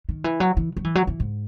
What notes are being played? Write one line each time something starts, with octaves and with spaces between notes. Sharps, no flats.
D#3
E3
F#3
E3
F#3
E3
F#3
E3
G#2